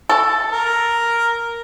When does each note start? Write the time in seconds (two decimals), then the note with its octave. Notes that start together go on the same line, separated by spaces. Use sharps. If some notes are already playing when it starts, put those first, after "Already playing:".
0.09 A4
0.52 A#4